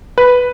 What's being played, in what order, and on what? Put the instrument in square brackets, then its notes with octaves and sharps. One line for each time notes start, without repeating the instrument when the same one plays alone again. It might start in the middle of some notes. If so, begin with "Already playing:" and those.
[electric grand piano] B4